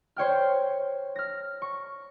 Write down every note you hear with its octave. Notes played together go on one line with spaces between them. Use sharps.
C5 C#5 G5 F6
F6 A#6
C#6